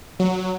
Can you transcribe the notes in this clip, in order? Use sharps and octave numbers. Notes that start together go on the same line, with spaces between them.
F#3